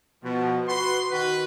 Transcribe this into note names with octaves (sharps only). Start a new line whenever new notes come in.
B2 F3
F#4 B4 C6
D#3 F#4 B4